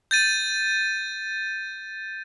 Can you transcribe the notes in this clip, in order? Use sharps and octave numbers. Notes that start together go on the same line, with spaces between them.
G6 A6 D#7